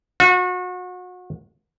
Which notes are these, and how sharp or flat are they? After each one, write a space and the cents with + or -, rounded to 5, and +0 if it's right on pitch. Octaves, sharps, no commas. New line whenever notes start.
F#4 -30